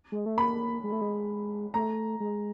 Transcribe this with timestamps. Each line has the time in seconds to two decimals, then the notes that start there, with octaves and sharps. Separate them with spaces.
0.12 G#3
0.26 A3
0.37 A#3 B5
0.84 G#3
0.92 A3
1.01 G#3
1.74 A3 A#5
2.20 G#3